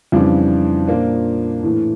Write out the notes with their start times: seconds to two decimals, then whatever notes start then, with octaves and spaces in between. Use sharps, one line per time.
0.12 F2 C#3 E3 G3 D4
0.87 A#2 F3 A#3 D4
1.63 A2 E3 A3